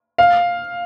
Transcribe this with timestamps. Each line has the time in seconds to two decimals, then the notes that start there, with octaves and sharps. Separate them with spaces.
0.18 F5